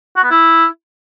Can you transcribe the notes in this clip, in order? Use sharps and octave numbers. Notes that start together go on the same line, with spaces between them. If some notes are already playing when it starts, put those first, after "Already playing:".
F#4
B3
E4